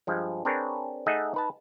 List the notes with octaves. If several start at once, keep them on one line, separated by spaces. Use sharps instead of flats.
G2 F3 G#3
C4 D4 G#4 A#4 B4 C#5
A3 D#4 G#4 D#5 E5 F#5
D#4 B4 A5